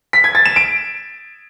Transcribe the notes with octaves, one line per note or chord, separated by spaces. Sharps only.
B6
G#6
A6
E7
D7